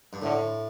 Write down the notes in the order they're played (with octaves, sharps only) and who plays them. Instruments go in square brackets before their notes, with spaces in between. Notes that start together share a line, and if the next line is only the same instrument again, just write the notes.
[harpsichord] G2
[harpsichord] A2 [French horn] D3